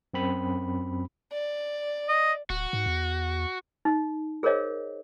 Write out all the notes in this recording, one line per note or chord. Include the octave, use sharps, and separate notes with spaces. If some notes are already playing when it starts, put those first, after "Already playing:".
F#2 C4 B5
D5
D#5
D1 F#4
G#2
E2
D#4
G#4 A#4 C5 C#5 D#5 F5